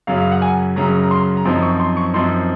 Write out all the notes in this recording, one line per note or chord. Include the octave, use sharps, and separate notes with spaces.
F#2 C#3 F#3 F5
F5
F#5
G#5
F#2 C#3 F#3 A#5
A#5
C6
A#5
F#2 F3 C4 D#4 C6
C#6
C6
C#6
F#2 F3 C4 D#4 C6